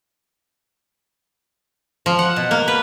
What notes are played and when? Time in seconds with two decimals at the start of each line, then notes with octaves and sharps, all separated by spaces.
2.06 F3
2.19 F#5
2.36 B2
2.51 A#3
2.68 B4